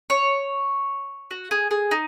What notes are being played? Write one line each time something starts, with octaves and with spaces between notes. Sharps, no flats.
C#5
F#4
G#4
G#4
D#4